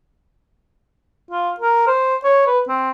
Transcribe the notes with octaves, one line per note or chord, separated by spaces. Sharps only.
F4
A#4
C5
C#5
B4
C4